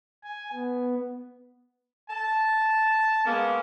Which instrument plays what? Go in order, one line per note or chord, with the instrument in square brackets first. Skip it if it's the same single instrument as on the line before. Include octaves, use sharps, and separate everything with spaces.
[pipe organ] G#5
B3
[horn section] A5
G#3 A#3 B3 C#4